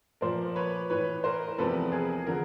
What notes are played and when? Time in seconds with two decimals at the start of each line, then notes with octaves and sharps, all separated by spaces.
0.21 A#2 F3 A#4 C5
0.56 B4 C#5
0.90 A2 E3 B4 C#5
1.24 A#4 C5
1.48 A#4
1.58 E2 C3 F3 A4 B4
1.92 G#4 A#4
2.27 D3 F3 G#4 A#4